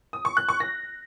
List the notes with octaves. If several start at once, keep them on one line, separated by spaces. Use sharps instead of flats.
D#6
C#6
F#6
C#6
A#6